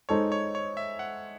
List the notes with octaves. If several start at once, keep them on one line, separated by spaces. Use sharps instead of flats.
G#3 D#4 A4 C5 C#5
C#5
C#5
E5
F#5